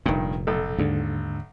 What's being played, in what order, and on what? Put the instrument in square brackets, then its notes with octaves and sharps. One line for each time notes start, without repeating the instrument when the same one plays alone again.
[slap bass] F1 A#2 [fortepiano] G2 D#3
[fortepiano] B1 A4
[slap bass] D#2 [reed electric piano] G#2 D3